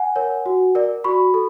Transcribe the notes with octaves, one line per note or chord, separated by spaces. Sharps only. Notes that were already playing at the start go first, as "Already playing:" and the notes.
Already playing: F#5 G#5
A#4 C#5
F#4
A#4 D5
F#4 B5 C#6
A4